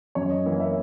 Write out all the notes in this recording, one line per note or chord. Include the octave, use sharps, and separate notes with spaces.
F#2 C#5
D#5
E3 A#3
E5